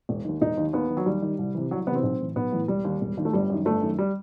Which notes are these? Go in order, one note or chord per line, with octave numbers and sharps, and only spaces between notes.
E1
D#2 D#3
E1 D#4
D#2 D#3
D#2 B3
D#3
F#3
D#2 G3
D#3
C2
C3 E3
C2 F#3
C3 E3 B3 C4
B1
A2 E3
B1 B3
A2 E3
E1 G3
D#2 D#3
E1
D#2 D#3
A3
G1 G3
F#2 D#3
G1 A3
F#2 D#3
G3